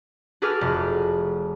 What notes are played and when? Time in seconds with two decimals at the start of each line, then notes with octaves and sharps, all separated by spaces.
0.42 F#4 G#4 A4 B4 D6 F6
0.61 F1